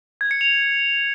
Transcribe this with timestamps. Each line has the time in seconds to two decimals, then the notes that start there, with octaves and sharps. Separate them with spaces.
0.21 G#6
0.31 C#7
0.41 F7